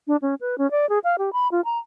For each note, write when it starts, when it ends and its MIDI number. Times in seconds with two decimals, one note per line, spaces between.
0.07 0.16 62
0.22 0.35 61
0.41 0.58 71
0.58 0.70 61
0.71 0.89 74
0.89 0.99 68
1.04 1.16 77
1.18 1.33 67
1.33 1.48 83
1.51 1.61 65
1.65 1.78 82